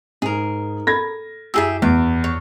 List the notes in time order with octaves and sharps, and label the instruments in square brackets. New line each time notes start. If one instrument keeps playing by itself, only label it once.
[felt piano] G#2 [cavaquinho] G#4 A#4
[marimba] A4 B5 [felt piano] G#6 A#6
[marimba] F#2 E4 E6 [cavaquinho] G4 G#4 E5
[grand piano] E2 [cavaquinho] D6
[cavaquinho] C#5